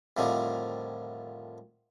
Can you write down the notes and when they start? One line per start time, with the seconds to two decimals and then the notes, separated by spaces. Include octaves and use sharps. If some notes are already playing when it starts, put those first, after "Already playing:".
0.17 F2 A2 D3 D#3 F3 G3